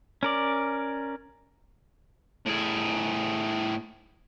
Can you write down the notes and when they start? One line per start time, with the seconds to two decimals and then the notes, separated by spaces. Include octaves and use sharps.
0.23 C#4 A#4 D5
2.46 A2 G#4